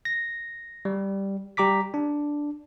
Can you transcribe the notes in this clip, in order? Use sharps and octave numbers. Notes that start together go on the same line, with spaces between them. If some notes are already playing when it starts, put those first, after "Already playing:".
A#6
G3
G3 G4 A#5 D6 B6
D4